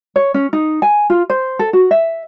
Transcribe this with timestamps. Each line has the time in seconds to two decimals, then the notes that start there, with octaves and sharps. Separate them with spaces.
0.16 C#5
0.34 C#4
0.53 D#4
0.82 G#5
1.10 F4
1.30 C5
1.59 A4
1.73 F#4
1.91 E5